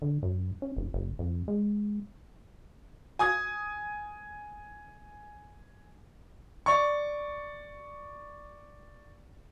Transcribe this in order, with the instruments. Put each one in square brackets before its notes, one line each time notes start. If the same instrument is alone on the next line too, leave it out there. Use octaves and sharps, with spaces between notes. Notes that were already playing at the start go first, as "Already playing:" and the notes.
[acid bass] D3
F#2
C#4
F1
F#1
F2
G#3
[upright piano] G#5 D#6 G#6
[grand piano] D5 C#6